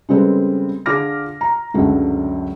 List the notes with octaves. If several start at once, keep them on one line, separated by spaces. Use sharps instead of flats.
C#3 G3 G#3 C4 A4 B4
D3 F4 G#4 D6 F6 A#6
A#5
C#2 F#2 D3 F#3 A3